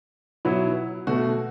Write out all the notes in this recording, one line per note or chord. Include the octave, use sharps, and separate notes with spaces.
B2 F#3 B3 E4
B2 A3 F#4